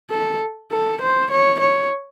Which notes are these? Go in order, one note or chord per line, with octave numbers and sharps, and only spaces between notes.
A4
A4
C5
C#5
C#5